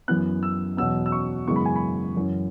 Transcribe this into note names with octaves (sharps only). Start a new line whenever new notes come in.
F#2 E3 B3 F#6
E6
E2 B2 F#3 B3 E6
E6
C#6
F#2 C#3 E3 G#3 B3 C#6
B5
G#5
B5
F#2 E3 C#4